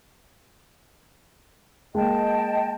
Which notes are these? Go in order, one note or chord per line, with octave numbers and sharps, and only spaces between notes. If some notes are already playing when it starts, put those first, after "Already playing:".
G#3 A#3 D#5 G5 A5